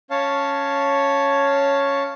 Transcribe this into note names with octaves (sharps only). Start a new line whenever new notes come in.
C#4 C#5 F5 A5